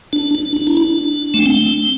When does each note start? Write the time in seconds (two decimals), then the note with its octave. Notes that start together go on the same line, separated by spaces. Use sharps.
0.13 D4
0.35 D4
0.57 D4
0.67 E4
0.77 D4
1.34 A3
1.46 C4